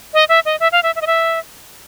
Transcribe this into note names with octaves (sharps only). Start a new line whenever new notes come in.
D#5
E5
D#5
E5
F5
E5
E5
D#5
E5